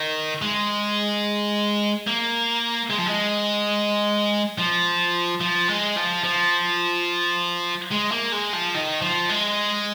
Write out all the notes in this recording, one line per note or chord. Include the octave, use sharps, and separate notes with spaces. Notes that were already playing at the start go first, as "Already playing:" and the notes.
Already playing: D#3
G#3
A#3
G#3
F3
G#3
F3
F3
G#3
F3
F3
G#3
A#3
G#3
F3
D#3
F3
G#3